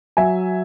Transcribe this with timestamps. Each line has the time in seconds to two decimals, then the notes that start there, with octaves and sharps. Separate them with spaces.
0.17 F#3 E5 G#5